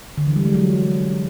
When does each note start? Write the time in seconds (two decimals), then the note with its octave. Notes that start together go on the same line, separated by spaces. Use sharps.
0.18 D3
0.27 E3
0.36 G3
0.45 G#3
0.54 F#3